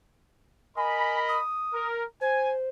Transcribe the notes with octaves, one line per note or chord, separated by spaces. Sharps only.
A#4 D#5 G#5 B5
D#6
A#4
C5 G#5